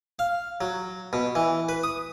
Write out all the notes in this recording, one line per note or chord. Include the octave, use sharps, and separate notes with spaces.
F5
F#3
B2
E3
B4
D#6